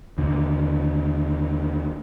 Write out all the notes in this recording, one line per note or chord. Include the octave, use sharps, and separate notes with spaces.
D#2 D3